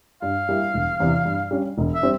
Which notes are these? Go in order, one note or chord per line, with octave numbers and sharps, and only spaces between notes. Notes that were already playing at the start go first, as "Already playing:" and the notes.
G2 F5
G3 A#3 E4
E1
E2 C3 E3
G2
G3 C#4
E1
E5
G3 C4